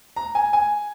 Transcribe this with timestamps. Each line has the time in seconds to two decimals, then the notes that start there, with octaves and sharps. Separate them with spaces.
0.16 A#5
0.35 G#5
0.53 G#5